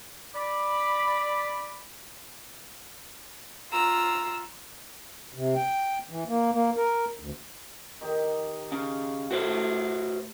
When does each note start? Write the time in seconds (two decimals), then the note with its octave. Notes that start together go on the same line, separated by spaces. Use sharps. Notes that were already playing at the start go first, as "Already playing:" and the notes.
0.35 D5 B5
3.71 F4 A#5 E6
5.34 C3
5.56 G5
6.10 E3
6.28 A#3
6.52 A#3
6.77 A#4
7.20 D2
8.01 D#3 G4 D#5
8.72 C#3
9.31 A2 F#4 B4 C5